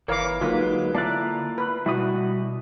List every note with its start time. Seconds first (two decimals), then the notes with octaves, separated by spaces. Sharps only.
0.08 G1 E3 A#4 C#5 F5 D6
0.41 D3 F#3 G#3 A#3 D#4 F4 B4
0.95 A#3 E4 F4 D5 A5 F#6
1.58 B4
1.86 B2 G3 E4 F#4 D#6